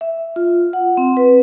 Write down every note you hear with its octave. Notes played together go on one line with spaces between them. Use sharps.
E5
F4
F#5
C4
B4